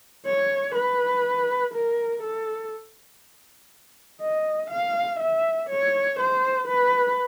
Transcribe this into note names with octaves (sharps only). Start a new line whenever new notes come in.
C#5
B4
A#4
A4
D#5
F5
E5
C#5
C5
B4